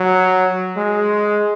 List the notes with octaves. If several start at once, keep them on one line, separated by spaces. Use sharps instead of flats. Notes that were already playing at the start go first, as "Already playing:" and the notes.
Already playing: F#3
G#3